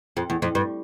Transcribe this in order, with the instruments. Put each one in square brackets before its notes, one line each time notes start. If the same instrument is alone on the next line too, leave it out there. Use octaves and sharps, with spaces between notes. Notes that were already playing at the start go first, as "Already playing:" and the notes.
[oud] F2
E2
F2
G2